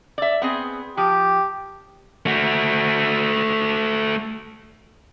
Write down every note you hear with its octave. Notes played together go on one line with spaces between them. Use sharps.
D5 E5
B3 C4 G#4
F3 G4
A3 F#4